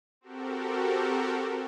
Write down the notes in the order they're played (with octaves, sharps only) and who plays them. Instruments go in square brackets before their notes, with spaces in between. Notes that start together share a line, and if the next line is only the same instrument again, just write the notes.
[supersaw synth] C4 F#4 G4 A4 A#4